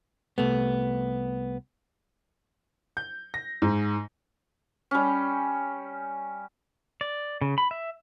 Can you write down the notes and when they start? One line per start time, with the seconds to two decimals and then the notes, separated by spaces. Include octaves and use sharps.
0.38 C2 A3 B3
2.97 G6
3.34 A#6
3.62 G#2
4.91 G3 C#4
7.01 D5
7.41 C#3
7.58 B5
7.71 E5